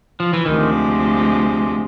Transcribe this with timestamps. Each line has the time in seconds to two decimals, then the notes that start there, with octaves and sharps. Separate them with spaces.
0.20 F3
0.33 E3
0.45 D2 C3 D#3 F3 G#3